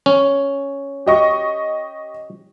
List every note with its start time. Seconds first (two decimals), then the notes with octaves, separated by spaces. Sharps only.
0.06 C#4
1.06 G4 D#5 C#6